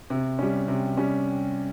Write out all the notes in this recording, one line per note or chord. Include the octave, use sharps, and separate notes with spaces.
C3
G3 C#4
C3
G3 C#4